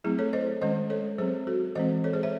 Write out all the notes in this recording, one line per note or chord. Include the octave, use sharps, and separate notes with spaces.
F#3 A3 C4 E4 G#4
A4 C#5
C5 D#5
D#3 G#3 C#4 C5 D#5
A4 C#5
F#3 C4 G#4 C5
F#4 A4
E3 G#3 C4 C5 D#5
A4 C#5
G#4 C5
C#5 E5